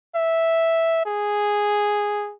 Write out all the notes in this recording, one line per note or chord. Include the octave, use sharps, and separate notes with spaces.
E5
G#4